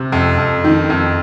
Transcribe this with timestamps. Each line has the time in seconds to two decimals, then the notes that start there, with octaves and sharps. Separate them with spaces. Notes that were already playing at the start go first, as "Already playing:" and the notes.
Already playing: C3
0.12 F2
0.38 F2
0.65 D#3
0.90 F2